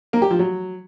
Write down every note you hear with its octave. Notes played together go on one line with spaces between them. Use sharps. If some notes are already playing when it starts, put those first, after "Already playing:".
A#3
G4
F3
F#3